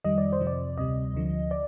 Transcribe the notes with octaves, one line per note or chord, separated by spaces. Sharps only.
F2 D#3 G3 D#5
D5
C5
F2 C3 F3
D5
D2 C3 G3 D#5
D2 D3 F3
D5